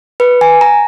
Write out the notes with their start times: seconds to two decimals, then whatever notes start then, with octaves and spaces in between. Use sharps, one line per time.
0.20 B4
0.41 G#5
0.61 A#5